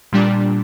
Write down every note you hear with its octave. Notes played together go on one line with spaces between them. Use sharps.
A#2 G3 D4